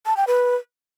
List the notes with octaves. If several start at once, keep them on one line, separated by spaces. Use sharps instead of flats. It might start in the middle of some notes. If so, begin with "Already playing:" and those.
A5
G5
B4